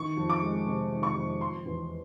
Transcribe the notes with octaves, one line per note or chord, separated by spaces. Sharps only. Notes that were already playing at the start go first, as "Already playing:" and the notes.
Already playing: D#3 C#6
F2
D6
G#3
C3
D#3
C#6
F2
F3 C6
E2